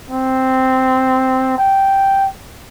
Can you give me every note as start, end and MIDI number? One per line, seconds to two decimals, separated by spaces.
0.11 1.54 60
1.58 2.26 79